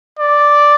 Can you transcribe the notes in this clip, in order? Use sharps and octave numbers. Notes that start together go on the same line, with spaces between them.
D5